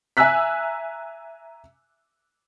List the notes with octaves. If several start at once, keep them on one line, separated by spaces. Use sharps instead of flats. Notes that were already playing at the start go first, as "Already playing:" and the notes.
E5 G#5 A#5 E6 F#6 B6